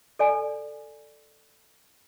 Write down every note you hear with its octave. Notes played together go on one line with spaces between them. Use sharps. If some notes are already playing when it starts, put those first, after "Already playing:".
A4 D5 G#5